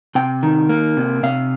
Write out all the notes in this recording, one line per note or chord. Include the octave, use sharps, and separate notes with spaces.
C3 G5
D#3
A#3
C3
C3 F5